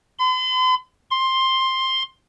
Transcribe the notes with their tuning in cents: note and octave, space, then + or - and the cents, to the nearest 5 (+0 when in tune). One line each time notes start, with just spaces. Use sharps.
C6 -45
C6 +10